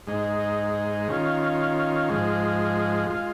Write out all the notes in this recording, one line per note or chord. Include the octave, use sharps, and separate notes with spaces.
G#2 G#3 D#4
D#3 C#4 F4
G#2 F3 G#3
G#3 F4